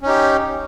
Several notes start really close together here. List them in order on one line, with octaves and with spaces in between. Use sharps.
C#4 D#4 G4